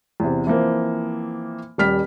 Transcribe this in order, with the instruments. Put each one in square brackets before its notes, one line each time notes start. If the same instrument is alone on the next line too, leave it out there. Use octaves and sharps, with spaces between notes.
[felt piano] E2 C3
E3 F3 A#3 C4
D#1 G3 F6 B6